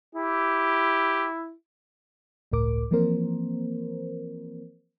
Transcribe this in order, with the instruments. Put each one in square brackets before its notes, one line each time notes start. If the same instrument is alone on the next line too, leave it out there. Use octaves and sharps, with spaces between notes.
[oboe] E4 [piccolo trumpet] G4
[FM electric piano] G1 C#2 A2 A#4 D6
E3 F3 A#3 C4 A#4 C5